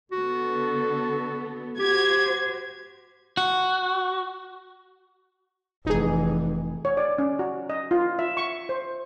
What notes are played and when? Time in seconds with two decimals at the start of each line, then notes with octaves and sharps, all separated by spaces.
0.12 D3 B3 F#4 A4
1.79 F#4 G4 C5 G#6
3.37 F#4
5.86 F1 E3 D#4 G#4
6.85 C#5
6.97 D5
7.19 C#4
7.39 F#4
7.70 D#5
7.91 F4
8.19 E5
8.37 C#6
8.69 C5